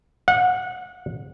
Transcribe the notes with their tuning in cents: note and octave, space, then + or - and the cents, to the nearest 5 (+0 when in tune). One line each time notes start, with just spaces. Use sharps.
F#5 -25